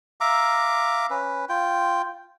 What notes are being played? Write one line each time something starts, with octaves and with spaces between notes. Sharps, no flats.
E5 F5 A#5 D6
C#4 B4
F4 G5